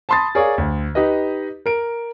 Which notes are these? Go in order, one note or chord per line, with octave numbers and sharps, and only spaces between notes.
A5 B5 C6 D#6 A6
G#4 A#4 C#5 D5 F5
D2
D#4 G4 B4 D#5
A#4 D7